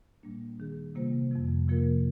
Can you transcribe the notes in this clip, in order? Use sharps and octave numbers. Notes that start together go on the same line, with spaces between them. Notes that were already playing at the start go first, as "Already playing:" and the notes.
A#2 G3 A#3 D4
D#3 G3 D4 G#4
C3 G3 A#3 F4 C5
F2 C3 F3
C3 F3 A#3 F4 A#4